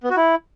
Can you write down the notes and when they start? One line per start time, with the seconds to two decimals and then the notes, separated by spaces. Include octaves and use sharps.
0.03 B3
0.10 F#4
0.17 E4